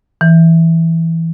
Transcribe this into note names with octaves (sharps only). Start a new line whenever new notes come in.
E3